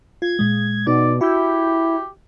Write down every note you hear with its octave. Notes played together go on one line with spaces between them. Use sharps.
F4 G#6
A#2 G#3
B2 D#4 D5
E4 F#4 G4 G6